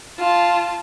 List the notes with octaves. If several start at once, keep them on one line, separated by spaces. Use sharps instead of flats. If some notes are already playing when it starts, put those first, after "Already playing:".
F4 A5